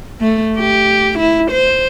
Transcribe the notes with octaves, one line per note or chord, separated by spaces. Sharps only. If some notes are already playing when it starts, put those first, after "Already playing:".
A3
G4
E4
C5